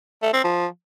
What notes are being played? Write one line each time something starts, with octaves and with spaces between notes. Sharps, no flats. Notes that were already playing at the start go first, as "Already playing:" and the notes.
A3
C4
F3